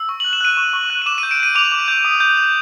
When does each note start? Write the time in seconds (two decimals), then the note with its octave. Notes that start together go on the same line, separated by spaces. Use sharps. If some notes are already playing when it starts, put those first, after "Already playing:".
Already playing: E6
0.09 C#6
0.20 F#7
0.25 F#6
0.33 E7
0.41 F#6 D#7
0.57 C#6
0.73 C#6
0.90 F#6
1.02 D#7
1.06 D6 E7
1.18 D#7
1.23 G6
1.31 D7
1.39 G6 D#7
1.55 D6 F7
1.72 D6
1.88 G6
2.05 D#6
2.20 G6
2.37 G6